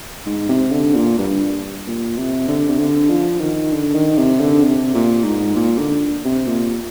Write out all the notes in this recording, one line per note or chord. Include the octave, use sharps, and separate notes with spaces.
G#2
C3
D3
A#2
G2
A#2
C3
D3
C3
D3
F3
D#3
D3
D#3
C3
D3
C3
A#2
G#2
A#2
D3
C3
A#2